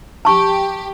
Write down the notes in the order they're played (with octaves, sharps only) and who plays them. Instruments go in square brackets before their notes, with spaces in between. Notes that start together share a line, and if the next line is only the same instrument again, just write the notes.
[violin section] G4 [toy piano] A5 C#6